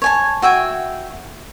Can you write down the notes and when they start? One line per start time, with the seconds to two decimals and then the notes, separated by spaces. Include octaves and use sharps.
0.02 C#5 G#5 A5
0.42 F#4 E5 G5 G#5